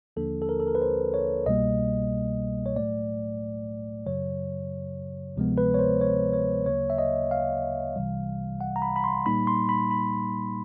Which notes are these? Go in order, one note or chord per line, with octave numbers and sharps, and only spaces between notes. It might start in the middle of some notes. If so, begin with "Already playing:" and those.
D#2 D3 F3 A#3 D4 A4
A4
A#4
A4
A#4
B4
C5
C#5
C2 B2 G3 A#3 D#5
C#5
A2 F#3 A3 D5
F#2 C#3 F#3 C#5
D2 C3 F3 G#3 B3
B4
C#5
C5
C#5
C#5
D2 C#3 F#3 A#3 C#5
E5
D#5
F5
C2 C3 E3 G3
F#5
A#5
B5
B5
C6
A#2 G3 A#3 D#4 B5
C6
B5
B5